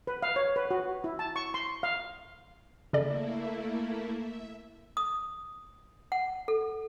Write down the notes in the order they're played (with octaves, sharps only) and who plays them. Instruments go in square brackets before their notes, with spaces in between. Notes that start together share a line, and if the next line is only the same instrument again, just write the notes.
[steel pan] B4
F5
C#5
B4
F#4
E4
A5
C#6
C6
F5
[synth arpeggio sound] C#3 A4 D5 [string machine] A3 A#3 E4
[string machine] E5
[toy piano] D#6
F#5
A4